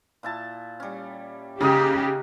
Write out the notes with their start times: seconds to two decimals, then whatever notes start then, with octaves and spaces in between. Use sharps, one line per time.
0.23 A#2 E4 A5
0.80 G3 C#4
1.61 C#3 A#3 D#4 F#4 G4 D#6